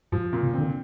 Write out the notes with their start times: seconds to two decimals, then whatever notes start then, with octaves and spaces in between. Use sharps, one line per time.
0.12 G2 F3
0.33 A#2
0.43 C3
0.53 D3 C4